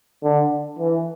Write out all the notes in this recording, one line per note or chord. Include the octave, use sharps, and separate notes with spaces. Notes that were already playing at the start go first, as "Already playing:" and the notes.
D3
E3